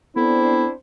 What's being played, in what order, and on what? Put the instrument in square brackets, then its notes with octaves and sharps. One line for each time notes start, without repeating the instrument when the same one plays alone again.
[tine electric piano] B3 A4 [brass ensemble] C4 D4 C5 [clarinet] E4